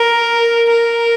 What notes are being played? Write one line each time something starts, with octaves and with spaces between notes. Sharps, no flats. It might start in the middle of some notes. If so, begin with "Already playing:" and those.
Already playing: A#4
A#4